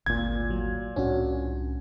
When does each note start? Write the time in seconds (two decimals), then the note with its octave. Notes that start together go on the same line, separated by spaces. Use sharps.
0.06 G#1 D2 A#2 G#6
0.50 F#3
0.96 C2 A2 C#4 D4 F#4